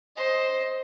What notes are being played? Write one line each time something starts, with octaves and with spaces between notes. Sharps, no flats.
C5 D#5